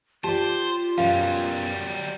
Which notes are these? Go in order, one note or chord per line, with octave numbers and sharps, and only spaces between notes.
F4 G4 C5 D5 A5
F#2 B2 F#3 G3 F5